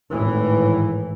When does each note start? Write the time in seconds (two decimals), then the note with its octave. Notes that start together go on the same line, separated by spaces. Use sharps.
0.11 G#1 A2 E3